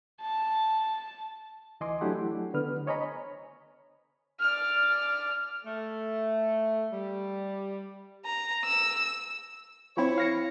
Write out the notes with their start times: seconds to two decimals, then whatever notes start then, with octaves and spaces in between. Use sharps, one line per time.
0.21 A5
1.81 D2 E3 D#5 G#5 C6 D6
2.01 F#3 A3 D4 E4 G4 F#5
2.54 D3 B3 B4 F6
2.87 C5 C#5 D#5 G#5 A#5 B5
4.40 D5 F6
5.65 A3
6.91 G3
8.26 A#5
8.66 E6
9.97 F3 C4 E4 C#5
10.18 F5 A#6 C#7